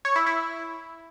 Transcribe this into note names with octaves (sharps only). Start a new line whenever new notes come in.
C#5
E4
E4